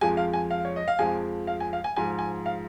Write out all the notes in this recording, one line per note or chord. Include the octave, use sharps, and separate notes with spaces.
F2 F3 G#3 G#5
F5
G#5
F5
C#5
D#5
F5
F2 F3 G#3 G#5
F5
G#5
F5
G#5
G#2 F3 G#3 G#5
G#5
F5